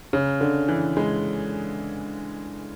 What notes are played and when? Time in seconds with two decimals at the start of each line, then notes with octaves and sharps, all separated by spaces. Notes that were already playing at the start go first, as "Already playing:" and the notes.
0.13 C#3
0.41 D3
0.68 E3
0.97 G#3